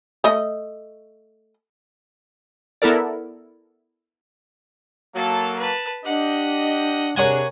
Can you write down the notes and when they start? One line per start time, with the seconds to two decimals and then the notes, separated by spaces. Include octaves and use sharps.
0.24 A3 D#5
2.82 B3 E4 A4 A#4 D5
5.15 F#3 A#3 A4 A5
5.59 B4 A5
6.05 D4 G4 D#5 F#5
7.17 C3 D4 G#4 A#4 C#5 F#5 G#5